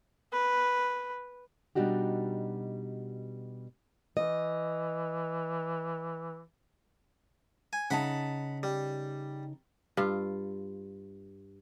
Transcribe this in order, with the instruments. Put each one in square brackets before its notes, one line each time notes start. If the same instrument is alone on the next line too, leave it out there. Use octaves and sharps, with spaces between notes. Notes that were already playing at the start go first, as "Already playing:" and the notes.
[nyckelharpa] B4
[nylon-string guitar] B2 G3 D4 D#4 F#4 G4
[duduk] E3 [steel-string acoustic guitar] D#5
[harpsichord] G#5
[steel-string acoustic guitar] C#3 D#4 A5 [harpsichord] F#5 B5
[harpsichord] G3
[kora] G2 F4